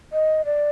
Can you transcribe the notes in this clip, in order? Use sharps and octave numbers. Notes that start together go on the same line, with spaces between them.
D#5
D5